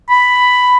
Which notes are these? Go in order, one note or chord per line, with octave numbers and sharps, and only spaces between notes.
B5